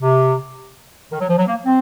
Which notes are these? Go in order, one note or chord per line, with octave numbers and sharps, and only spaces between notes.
C3
D#3
F#3
F3
F#3
A#3
C4